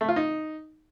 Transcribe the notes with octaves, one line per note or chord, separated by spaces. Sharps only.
A3
F4
D#4